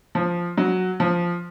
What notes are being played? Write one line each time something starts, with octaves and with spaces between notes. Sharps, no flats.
F3
F#3
F3